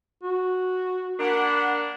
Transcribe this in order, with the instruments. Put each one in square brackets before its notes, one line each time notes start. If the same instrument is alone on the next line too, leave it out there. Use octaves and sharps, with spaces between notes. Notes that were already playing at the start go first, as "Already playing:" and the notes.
[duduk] F#4
[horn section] A#3 D4 [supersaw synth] A#4 F#5 B5